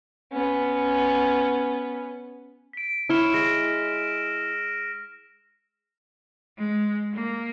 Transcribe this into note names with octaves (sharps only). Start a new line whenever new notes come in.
B3 C#4
B6 D7
E4 C#5 C6 E6 F6 E7
G#3 A#6
G#3
A#3